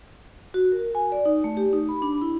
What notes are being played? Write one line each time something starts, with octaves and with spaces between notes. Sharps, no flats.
F#4
A#4
G#5
D5
D#4
A3
G4
D#4
B5
D4
E4